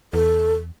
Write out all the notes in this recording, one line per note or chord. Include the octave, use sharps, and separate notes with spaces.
E2 A4